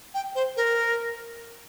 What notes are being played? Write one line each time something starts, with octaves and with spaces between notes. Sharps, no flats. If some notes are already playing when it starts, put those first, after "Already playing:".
G5
C5
A#4